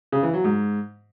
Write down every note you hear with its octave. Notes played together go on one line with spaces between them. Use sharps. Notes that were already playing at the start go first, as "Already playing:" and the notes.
C#3
E3
F#3
G#2